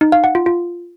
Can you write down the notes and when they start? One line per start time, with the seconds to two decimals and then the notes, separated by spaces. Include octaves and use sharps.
0.01 D#4
0.12 F5
0.24 F#5
0.35 F4
0.46 F4